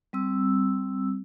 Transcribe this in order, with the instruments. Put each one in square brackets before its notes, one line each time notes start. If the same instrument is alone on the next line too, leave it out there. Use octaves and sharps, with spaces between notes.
[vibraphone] G3 C4 E6